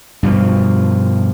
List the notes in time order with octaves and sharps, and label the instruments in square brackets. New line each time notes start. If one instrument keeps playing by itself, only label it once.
[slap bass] G2 B2 F3